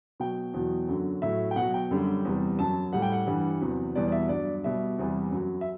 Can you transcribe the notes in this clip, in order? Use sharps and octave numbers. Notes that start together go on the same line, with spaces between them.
B2 F#3 G5
E2 B2 F#3
F#2 D3 F#3
A2 F#3 E5
G5
B2 F#5
F#3
G5
F#2 D3 G3
E2 C3 G3
F#2 F#3 A5
A2 G3 F#5
G5
F#5
G2 E3 G3
E2 C3 F#3
E2 B2 G3 D5
D5
E5
G2 F#3 D5
B2 G3 E5
E2 C3 E3 G3
F#2 F#3
E5